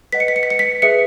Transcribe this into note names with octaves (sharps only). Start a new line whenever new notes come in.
B4 D#5 F#5 B6
C#7
B6
C#7
B6
C#7
B6
G#4 B4 E5 C#7